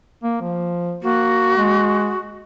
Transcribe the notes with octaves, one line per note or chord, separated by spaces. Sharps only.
A#3
F3
A#3 F#4
G#3